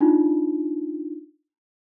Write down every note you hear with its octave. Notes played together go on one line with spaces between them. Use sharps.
D4 D#4 F4